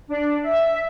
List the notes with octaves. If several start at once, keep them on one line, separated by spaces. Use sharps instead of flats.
D4
E5